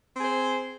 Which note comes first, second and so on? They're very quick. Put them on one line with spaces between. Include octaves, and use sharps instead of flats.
C4 G#4 C5